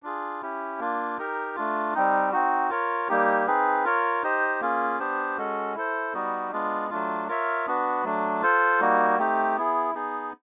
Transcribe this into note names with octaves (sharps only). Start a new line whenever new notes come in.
D4 F4 G#4
C#4 E4 G4
A#3 D4 F4
D#4 G4 A#4
A3 D4 F4
G3 C4 D#4
C4 D#4 F#4
F4 A#4 C#5
G3 A#3 D#4 G4
C4 D#4 G#4 B4
F4 A#4 C#5
D#4 G4 C5 D#5
A#3 C#4 F4 G#4
B3 D4 G4 C5
G#3 C#4 F#4 A4
E4 A4 C5
G3 B3 D#4 F#4
G#3 B3 D4 F4
F#3 A3 D4 F4
F4 A#4 C#5 E5
B3 D4 F#4 B4
F#3 A3 D4
F4 A4 C5
G3 A#3 D#4 F#4
A3 C4 D#4 G4
B3 E4 G#4
B3 D#4 G#4